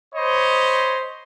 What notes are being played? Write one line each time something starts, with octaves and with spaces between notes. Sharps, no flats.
C5 C#5 D#5 B5